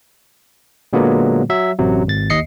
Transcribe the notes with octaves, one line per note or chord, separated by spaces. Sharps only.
A#2 D3 F#3 G#3 A#3 B3
F#3 E5
A1 F#2 C3 F#3
G#1 A6
D#2 D#5 C7 C#7